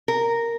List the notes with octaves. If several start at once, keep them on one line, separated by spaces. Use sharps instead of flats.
A#4